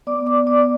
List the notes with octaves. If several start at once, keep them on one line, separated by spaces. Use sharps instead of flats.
B3 D5 D6
D5 D6
B3
D5 D6